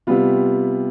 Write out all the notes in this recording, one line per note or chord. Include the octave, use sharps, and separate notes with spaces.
C3 G3 B3 F4